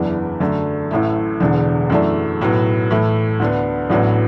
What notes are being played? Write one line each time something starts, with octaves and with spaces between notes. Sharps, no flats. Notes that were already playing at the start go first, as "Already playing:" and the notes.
Already playing: F#1 E2 E3 B3 D4
F#2 D3 A3
A1 A2 A3 E4
E1 E2 D3
F#2 E3 A3 D4
B1 A2 F#3 B3
A2 E3 A3 E4
D2 D3 B3
A1 A2 F#3 B3 D4